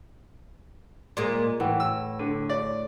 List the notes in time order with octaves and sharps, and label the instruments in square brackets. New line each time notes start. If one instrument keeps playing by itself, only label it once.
[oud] A#2 G#3 A#3 [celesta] D5
[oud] A2 [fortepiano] E3 [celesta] B4 F#5 G5
[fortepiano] E6
[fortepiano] D3 [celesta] D#7
[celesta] C#5 [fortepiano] D5